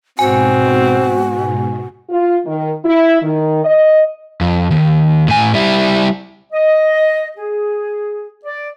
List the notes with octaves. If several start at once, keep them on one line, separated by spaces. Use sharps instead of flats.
G#2 B2 C4 F#4 G#5
F4
D#3
E4
D#3
D#5
F2
D#2
A2 G#5
G3 E4
D#5
G#4
D5